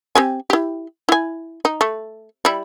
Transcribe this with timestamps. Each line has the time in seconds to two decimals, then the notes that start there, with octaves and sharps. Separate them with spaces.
0.15 C4 G4 G#5
0.50 E4 G4
1.09 E4 G#5
1.65 D#4
1.81 A3
2.45 G3 E4